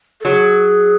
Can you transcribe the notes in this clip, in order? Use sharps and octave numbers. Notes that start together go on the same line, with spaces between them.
A4
F#3 G#4